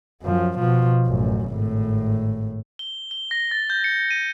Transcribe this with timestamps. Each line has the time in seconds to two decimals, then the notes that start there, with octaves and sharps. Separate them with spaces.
0.22 F#2 F3
0.58 B2 F3
1.06 A1 F#2
1.49 G#1 A2
2.79 G7
3.11 G7
3.31 A#6
3.51 A6
3.70 G6
3.84 C#7
4.11 D#7